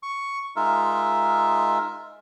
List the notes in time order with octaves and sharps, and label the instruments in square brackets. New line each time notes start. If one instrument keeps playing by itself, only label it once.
[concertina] C#6
G#3 D#4 F4 A#4 E5